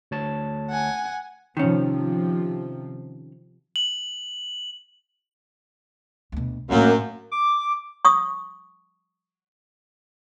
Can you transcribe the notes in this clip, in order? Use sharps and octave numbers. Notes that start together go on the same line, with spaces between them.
D2 C#5 A5
F#5 G#5
C3 D#3 F3 C#4
F#7
D2 B2
F#2 A2 F#3 A#3 D4
D6
C#6 D#6